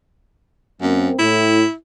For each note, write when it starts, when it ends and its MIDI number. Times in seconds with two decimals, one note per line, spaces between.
0.81 1.09 42
0.81 1.15 58
0.81 1.15 60
1.19 1.62 45
1.19 1.73 64